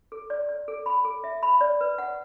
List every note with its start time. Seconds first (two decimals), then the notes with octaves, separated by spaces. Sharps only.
0.12 A4
0.30 D5
0.49 D5
0.68 A4
0.86 B5
1.05 A4
1.24 E5
1.43 B5
1.61 D5
1.81 B4
1.98 F#5